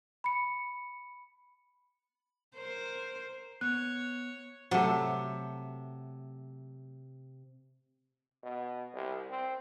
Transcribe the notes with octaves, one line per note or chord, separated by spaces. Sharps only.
B5 C#7
A#4 C5
B3 C#5 F#6
C3 F#3 A3
B2
C2
C4